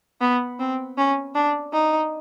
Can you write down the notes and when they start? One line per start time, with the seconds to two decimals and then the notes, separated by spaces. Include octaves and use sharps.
0.21 B3
0.60 C4
0.98 C#4
1.35 D4
1.73 D#4